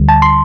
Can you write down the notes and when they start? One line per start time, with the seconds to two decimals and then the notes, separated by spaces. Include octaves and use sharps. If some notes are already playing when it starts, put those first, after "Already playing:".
Already playing: D2 D3 G3
0.09 A5
0.22 C6